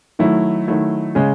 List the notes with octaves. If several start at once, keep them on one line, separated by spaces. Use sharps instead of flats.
D#3 F#3 A3 E4
D#3 F#3 A3 E4
C#3 G#3 C#4 G#4